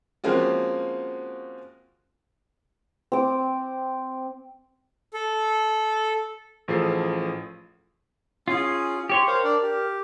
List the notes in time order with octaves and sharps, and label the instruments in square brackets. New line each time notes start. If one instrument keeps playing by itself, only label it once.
[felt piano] F3 G#3 A#3 C4 C#4 F#4
[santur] C4 D6
[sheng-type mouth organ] A4
[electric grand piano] A1 F3 G#4 A4 C7
[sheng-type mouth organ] C#4 [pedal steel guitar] F4 G#4
[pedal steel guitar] G4 C#5 C6
[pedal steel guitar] A#4 [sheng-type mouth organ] C5 C#5 F5
[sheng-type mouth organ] D4 D5
G4